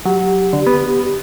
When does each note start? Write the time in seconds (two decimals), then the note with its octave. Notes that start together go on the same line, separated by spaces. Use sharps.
0.05 F#3 G4
0.53 D3
0.67 B3